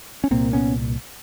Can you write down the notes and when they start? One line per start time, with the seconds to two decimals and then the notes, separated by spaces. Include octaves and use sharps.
0.24 C#4
0.31 C2 A#2 A#3 C4
0.53 B3 C#4